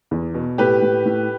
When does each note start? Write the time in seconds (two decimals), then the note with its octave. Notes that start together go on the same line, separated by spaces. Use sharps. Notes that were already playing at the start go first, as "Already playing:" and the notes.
0.11 E2
0.34 B2
0.58 A2 G4 B4
0.82 A2
1.06 A2